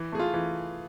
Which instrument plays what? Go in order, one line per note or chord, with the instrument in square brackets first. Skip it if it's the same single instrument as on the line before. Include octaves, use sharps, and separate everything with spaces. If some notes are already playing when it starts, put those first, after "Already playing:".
Already playing: [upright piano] E3
[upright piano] A3 [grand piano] G#4
[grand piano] F4
[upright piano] E3